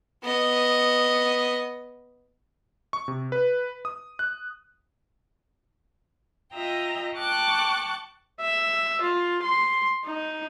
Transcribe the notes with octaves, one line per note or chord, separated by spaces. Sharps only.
B3 D#5
C#6
C3
B4
D#6
F#6
F4 D#5 E5 G5 A#5
G5 A5 C#6 D6 F#6 A6
E5
F4
C6
D#4